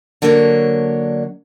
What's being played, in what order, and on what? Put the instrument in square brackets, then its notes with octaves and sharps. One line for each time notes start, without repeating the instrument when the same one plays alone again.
[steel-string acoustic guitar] D3 F#3 A#3 D4 C#5